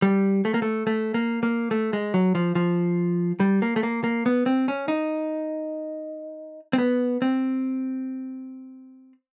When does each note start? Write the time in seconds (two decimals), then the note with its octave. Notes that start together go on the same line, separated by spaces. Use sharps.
0.02 G3
0.45 A3
0.54 A#3
0.62 A3
0.87 A3
1.14 A#3
1.43 A#3
1.71 A3
1.93 G#3
2.14 F#3
2.35 F3
2.55 F3
3.40 G3
3.62 A#3
3.76 A3
3.83 A#3
4.04 A#3
4.26 B3
4.46 C4
4.68 C#4
4.88 D#4
6.73 C4
6.78 B3
7.22 C4